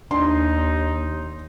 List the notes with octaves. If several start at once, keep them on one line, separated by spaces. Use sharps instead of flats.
D#2 D4 D#4 C6